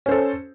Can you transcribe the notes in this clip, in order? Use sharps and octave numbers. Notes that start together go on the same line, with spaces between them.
C#4 A4 C5